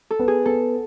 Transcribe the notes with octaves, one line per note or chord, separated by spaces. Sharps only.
A4
B3
G#4
B3 A4